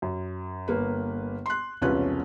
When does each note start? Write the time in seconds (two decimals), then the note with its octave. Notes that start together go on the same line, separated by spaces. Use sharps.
0.02 F#2
0.68 G1 A#3 B4
1.46 C6 F#6
1.82 E1 C2 C#4 F4 B4 F#6